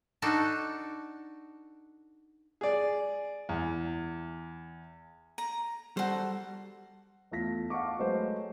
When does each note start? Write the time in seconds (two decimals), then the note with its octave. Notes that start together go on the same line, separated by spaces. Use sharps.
0.22 D4 D#4 F#4 A4
2.61 G#4 D5
3.49 E2
5.38 A#5
5.97 G3 F#4 A4 C5
7.31 E2 A3 F4 A#6 B6
7.70 F5 F#5 A5 C#6 D6
7.99 F#3 G#3 A3 B4 C5